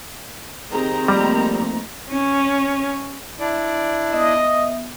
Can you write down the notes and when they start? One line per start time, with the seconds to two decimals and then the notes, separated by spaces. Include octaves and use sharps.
0.71 D#3 C4 G4 G#4 A#5
1.08 F3 G3 A3 A#3
2.11 C#4
3.40 D4 E4 D5
4.13 B3 D#5 E5